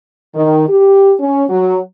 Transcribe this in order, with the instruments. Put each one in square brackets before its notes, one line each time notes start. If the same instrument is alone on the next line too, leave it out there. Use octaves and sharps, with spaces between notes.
[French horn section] D#3
G4
C#4
F#3